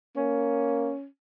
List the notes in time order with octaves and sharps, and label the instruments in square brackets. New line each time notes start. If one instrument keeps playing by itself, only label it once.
[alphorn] A#3 [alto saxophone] C#4